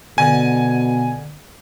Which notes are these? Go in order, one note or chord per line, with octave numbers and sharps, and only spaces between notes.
B2 D3 G#5